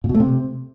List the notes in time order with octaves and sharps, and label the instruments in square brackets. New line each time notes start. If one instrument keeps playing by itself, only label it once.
[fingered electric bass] A#2
B2
A3
C3